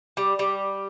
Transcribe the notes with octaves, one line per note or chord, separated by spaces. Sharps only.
G3
G3